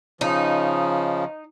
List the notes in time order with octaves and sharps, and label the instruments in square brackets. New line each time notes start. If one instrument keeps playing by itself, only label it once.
[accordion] C#3 F3 [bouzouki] D#4